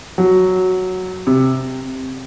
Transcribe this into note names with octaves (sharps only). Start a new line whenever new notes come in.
F#3
C3